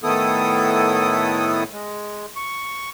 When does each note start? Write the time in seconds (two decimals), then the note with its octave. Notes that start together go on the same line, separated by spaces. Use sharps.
0.03 A2 D#3 B3 E4 A4 D#6
1.72 G#3
2.36 C#6